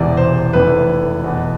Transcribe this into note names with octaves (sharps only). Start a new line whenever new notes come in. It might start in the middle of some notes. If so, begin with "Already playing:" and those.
Already playing: E1 E2 C3 E3 D5
C5
F1 F2 E3 B4
E2 B2